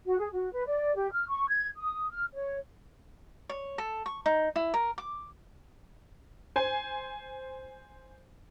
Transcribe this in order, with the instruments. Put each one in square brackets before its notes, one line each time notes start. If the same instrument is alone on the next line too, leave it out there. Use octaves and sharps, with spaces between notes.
[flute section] F#4
G#4
F#4
B4
D5
G4
F6
C#6
G#6
D#6
F6
C#5
[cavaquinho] C#5
A4
C#6
D#4
E4
A#4
D6
[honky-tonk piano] C5 G#5